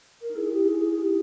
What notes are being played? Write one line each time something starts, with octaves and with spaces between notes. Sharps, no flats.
A#4
D#4
E4 G#4
E4 G4
G#4
G#4
G#4
D#4 G4